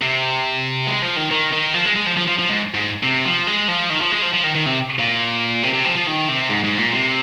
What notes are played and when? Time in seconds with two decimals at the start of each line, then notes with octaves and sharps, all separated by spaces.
0.01 C3
0.87 G#3
1.02 F3
1.16 D#3
1.31 D#3
1.52 D#3
1.74 F3
1.85 G#3
1.96 G#3
2.06 F3
2.17 F3
2.27 F3
2.39 F3
2.49 G#2
2.74 G#2
3.03 C3
3.25 F3
3.47 G#3
3.68 F3
3.90 D#3
4.01 F3
4.12 G#3
4.22 F3
4.34 F3
4.44 D#3
4.55 D#3
4.66 C3
4.99 A#2
5.63 C3
5.73 C3
5.85 F3
5.95 F3
6.07 D#3
6.29 C3
6.49 G#2
6.64 G#2
6.78 A#2
6.93 C3